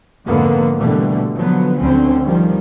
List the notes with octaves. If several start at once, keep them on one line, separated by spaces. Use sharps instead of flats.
F2 G#2 D3 A#3 B3
B2 D3 E3 G3 A3
D3 F3 F#3 B3
D2 D3 C4 C#4
D#3 F3 G3